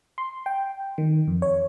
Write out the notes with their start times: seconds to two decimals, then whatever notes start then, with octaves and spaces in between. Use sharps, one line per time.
0.18 C6
0.46 G5
0.98 D#3
1.28 F2
1.42 C#5